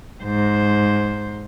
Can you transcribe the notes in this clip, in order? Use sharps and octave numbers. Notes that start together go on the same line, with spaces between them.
G#2 C5